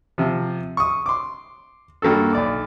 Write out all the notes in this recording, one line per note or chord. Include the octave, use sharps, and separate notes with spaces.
C3 F3
C#6 D#6
C6 D6
G2 A#3 F#4 A4
B1 D5 D6